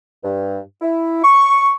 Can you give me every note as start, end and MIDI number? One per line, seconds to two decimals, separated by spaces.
0.23 0.59 43
0.82 1.21 64
1.24 1.74 85